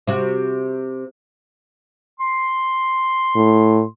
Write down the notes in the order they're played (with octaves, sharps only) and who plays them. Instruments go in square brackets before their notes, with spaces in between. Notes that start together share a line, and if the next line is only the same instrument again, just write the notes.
[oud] C3 F#4
[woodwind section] C6
[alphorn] A2